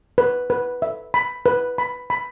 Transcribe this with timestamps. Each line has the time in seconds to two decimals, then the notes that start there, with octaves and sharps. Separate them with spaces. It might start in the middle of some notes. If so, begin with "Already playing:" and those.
0.18 B4
0.50 B4
0.82 E5
1.14 B5
1.46 B4
1.78 B5
2.10 B5